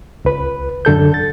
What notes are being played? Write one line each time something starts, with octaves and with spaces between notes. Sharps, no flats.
C#2 B4
F#2 D3 A4 G6
A6